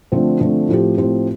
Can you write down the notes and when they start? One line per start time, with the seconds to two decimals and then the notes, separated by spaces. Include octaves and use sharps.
0.12 D3 F3 A3 C4
0.40 D3 F3 A3 C4
0.69 A2 F3 C4 G4
0.98 A2 F3 C4 G4